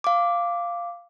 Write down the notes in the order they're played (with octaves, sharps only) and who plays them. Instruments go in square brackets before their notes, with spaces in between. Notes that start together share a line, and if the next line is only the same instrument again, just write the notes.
[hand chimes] F5 D6